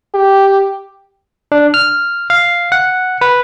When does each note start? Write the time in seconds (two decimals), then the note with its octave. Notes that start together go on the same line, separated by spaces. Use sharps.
0.15 G4
1.52 D4
1.74 F6
2.30 F5
2.72 F#5
3.21 B4